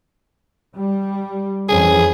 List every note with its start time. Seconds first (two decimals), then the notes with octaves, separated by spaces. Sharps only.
0.76 G3
1.69 F2 E3 C#4 G#4